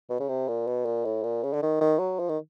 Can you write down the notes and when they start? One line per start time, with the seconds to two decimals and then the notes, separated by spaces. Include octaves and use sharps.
0.10 B2
0.20 C#3
0.29 C3
0.48 A#2
0.68 B2
0.86 A#2
1.05 A2
1.23 A#2
1.44 C#3
1.53 D3
1.62 D#3
1.81 D#3
1.99 F#3
2.19 F3
2.29 D#3